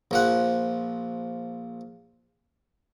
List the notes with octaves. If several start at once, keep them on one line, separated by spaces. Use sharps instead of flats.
A#1 F3 F#5